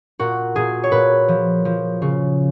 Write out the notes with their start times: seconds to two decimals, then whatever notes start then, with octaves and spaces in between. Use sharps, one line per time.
0.19 A#2 F#4
0.56 A#2 G#4
0.84 C#5
0.92 A#2 B4
1.28 F3
1.65 F3
2.02 C#3